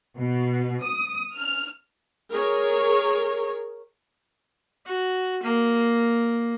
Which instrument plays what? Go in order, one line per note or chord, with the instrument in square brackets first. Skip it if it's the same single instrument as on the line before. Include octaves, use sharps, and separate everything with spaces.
[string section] B2
D#6
F6
[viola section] G#4 A#4 C#5
[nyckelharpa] F#4
A#3